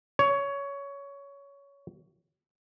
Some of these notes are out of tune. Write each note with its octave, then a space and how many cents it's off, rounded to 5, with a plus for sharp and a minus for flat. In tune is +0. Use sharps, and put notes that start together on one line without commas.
C#5 +15